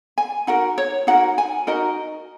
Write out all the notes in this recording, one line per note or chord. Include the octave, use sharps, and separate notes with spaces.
G#5
D#4 F#4 A#4 F#5
C#5
D#4 F#4 A#4 F#5
G#5
D#4 F#4 A#4 D#5